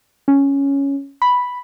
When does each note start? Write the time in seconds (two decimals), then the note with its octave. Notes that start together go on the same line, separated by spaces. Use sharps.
0.28 C#4
1.22 B5